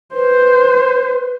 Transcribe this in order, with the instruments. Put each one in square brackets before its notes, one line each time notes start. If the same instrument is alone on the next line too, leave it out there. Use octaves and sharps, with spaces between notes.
[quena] B4 [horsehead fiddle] C5